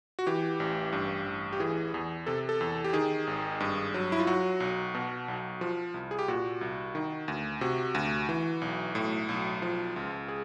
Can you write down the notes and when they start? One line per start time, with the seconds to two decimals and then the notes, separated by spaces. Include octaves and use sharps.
0.19 F#4
0.27 E3 G4
0.60 A1
0.93 G2
1.26 A1
1.53 G4
1.60 E3 G#4
1.94 E2
2.27 C3 A4
2.49 A4
2.61 E2
2.84 G4
2.93 D#3 G#4
3.27 G#1
3.60 G2
3.94 F#3
4.12 E4
4.20 F4
4.27 F#3 F#4
4.60 B1
4.94 B2
5.28 B1
5.61 F3
5.94 C2
6.11 G#4
6.19 G4
6.28 A#2 F#4
6.61 C2
6.95 D#3
7.28 D2
7.61 C3 F#4
7.95 D2
8.29 E3
8.62 B1
8.95 A2
9.29 B1
9.62 F3
9.96 C#2
10.28 G#4